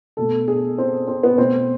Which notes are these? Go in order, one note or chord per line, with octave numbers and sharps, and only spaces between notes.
B2 A3 A4
G#4
C4
C4
B3
B2 A3 C4